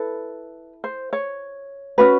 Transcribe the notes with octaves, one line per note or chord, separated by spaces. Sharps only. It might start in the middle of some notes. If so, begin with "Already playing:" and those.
Already playing: E4 A4 B4
C5
C#5
C#4 F#4 B4